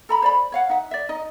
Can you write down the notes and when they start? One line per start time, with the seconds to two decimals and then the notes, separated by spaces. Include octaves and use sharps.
0.09 A4 A#5 B5
0.22 C5 D5 B5
0.52 C#5 F5 F#5
0.69 D#4 E5 F#5
0.91 D5 E5
1.09 D#4 D#5